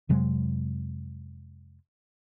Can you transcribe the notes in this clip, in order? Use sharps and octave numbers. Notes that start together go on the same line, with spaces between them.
F2 C3 F#3 G#3